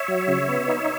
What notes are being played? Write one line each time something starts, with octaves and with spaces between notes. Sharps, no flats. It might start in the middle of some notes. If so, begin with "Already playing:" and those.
Already playing: C#5 E5
F#3
C#3
B3
D#4